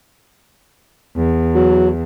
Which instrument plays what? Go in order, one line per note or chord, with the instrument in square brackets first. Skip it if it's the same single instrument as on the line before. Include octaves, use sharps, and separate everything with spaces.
[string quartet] E2
[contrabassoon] F#3